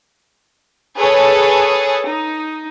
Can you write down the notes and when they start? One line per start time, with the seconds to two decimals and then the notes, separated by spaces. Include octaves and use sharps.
0.98 G#4 A4 B4 C#5 A5
2.06 D#4